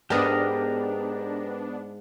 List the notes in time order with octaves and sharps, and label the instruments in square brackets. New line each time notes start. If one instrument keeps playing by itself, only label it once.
[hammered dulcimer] G#2 [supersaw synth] B3 D4 [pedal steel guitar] G4 A#4 D#6